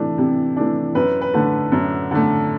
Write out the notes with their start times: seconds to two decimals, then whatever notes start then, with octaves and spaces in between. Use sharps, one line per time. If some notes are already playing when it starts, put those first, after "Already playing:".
Already playing: C3 E3 A3 D4
0.18 C3
0.56 E3 A3 D4
0.95 F#2 B4
1.21 B4
1.34 D3 A3
1.72 F#2
2.11 D3 A3